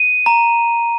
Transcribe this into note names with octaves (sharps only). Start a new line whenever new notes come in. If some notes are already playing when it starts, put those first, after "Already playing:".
Already playing: D#7
A#5